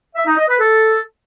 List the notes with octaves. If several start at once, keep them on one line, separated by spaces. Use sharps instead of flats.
E5
D#4
D#5
B4
A4